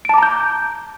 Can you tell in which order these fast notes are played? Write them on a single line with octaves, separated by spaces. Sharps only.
D7 A5 D6 A#5 G6